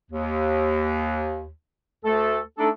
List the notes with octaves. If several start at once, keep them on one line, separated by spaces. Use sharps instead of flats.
D#2
D2 A3 A4
A3 D4 D#4 A4